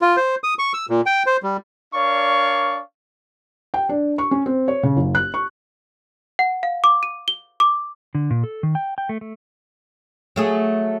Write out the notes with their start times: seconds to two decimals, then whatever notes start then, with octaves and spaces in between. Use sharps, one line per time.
0.02 F4
0.17 C5
0.44 D#6
0.59 C#6
0.74 E6
0.90 A#2
1.06 G5
1.26 C5
1.43 G3
1.95 D4 A#4 C#5 D5 F5 C#6
3.74 G5
3.89 D4
4.18 C#6
4.31 C#4
4.46 C4
4.68 C#5
4.83 C#3
4.96 F#1
5.15 F#6
5.34 C#6
6.39 F#5
6.63 F5
6.84 D6
7.03 D#7
7.28 G7
7.60 D6
8.15 D3
8.30 A#2
8.44 A4
8.63 D#3
8.75 G5
8.98 G5
9.09 A3
9.21 A3
10.36 F#3 A3 G#4